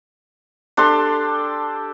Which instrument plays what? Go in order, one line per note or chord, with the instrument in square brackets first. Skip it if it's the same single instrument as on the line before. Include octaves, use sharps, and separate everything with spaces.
[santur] D4 G4 A4 C6